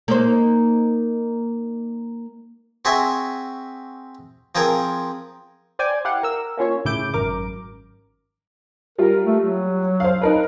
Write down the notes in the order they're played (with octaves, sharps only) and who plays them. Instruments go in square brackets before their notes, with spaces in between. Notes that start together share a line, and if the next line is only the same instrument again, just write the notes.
[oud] A#3 D#4 C5
[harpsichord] C4 F#4 G#4 E5 G#5
F3 C4 F4 G#4 A#4
[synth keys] C5 D5 G5 G#5
E4 G4 F5 F#5
A#4 E6
A#3 C#4 F4 C#5
A2 C#3 E4 D6 G6 D7
G#1 F#2 A#4 D6
[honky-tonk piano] G3 F4 [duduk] A#4
[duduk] A3
F#3
[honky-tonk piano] C5 F5
D#4 A#4 B4